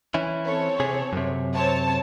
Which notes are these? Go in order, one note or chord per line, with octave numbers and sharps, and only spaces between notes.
E3 C#4 E4
C4 A4 C#5
C3 G#4
F#2 C3
C4 C#5 A5